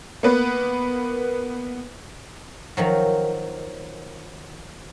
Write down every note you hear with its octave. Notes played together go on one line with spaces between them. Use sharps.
A#3 B3 B4
D#3 F3 F#3